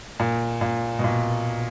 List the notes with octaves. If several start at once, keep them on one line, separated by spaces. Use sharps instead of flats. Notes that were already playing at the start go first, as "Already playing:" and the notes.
A#2
A#2
B2
A#2